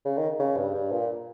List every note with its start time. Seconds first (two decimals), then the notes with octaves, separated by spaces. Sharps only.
0.05 C#3
0.17 D#3
0.39 C#3
0.57 G2
0.74 G2
0.92 A#2